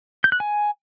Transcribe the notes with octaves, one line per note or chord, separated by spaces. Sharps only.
G6
F#6
G#5